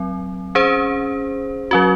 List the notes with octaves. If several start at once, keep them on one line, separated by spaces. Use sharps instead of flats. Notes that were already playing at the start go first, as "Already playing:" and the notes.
Already playing: F#3 C4
C#4 G#4 C5
F#3 C#4 F#4